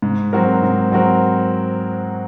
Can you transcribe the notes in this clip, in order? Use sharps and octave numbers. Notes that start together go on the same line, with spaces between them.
G#2
F#3 C4 F#4 A#4
G#2
F#3 C4 F#4 A#4